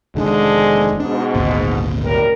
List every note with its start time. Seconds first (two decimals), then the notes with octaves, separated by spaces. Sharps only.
0.15 F1 D3 D#3 F3 G#3 D4
1.00 G#2 B2 D4
1.34 G#1 D2 A#2
2.03 F#2 G3 A#4